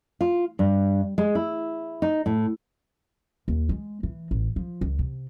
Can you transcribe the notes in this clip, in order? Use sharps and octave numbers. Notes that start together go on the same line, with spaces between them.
F4
G2
G#3
E4
D#4
A2
D#2
G#3
E3
A1
F3
C#2
C3